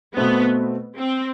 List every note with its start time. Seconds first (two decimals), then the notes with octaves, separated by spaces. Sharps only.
0.16 B2 A3 B3 C4
0.98 C4